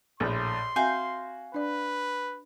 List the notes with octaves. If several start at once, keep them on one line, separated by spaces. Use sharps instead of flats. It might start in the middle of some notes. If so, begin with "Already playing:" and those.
A#1 A2 C6
C4 F#4 E5 F5 G5 G#5 G6
D4 B4 D5